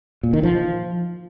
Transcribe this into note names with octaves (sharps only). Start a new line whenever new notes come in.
A#2
D#3
F3